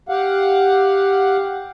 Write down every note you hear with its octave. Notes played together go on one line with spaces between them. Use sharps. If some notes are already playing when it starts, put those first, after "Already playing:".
G4 F5 F#5